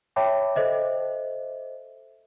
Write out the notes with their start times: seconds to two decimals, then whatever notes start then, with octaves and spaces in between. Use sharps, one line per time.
0.16 C#5 E5 G5 A5 B5 D6
0.56 A4 C5 D#5 E5